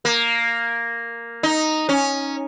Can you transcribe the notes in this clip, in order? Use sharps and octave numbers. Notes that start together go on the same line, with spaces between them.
A#3
D#4
C#4